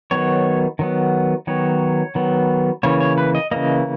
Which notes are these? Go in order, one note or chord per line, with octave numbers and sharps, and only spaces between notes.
D#3 F#3 B3 C#5
D#3 F#3 B3
D#3 F#3 B3 C#5
D#3 F#3 B3
C#3 E3 A#3 C#5
C#5
B4
D#5
C#3 E3 A#3 D#5